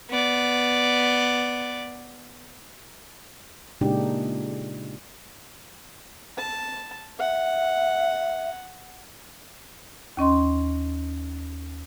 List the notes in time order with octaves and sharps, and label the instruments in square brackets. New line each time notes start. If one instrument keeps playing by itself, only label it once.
[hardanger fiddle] B3 D5
[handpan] A#2 C#3 G#3 D4 D#4 G4
[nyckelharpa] A5
[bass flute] E5 [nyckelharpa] F#5
[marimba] D#2 C#4 D#5 C6